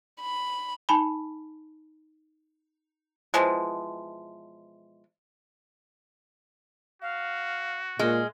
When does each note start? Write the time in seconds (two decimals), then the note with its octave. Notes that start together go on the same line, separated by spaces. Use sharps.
0.21 B5
0.89 D#4 G#5 A5 B5
3.34 B2 E3 F3 G#3
7.02 F#4 F5
7.99 A#2 G#3 F6